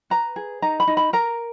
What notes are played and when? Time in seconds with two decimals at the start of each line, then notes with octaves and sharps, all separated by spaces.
0.10 B4 A#5
0.36 G#4
0.62 D#4 A#5
0.80 B5
0.88 D#4
0.97 B5
1.13 A#4 A#5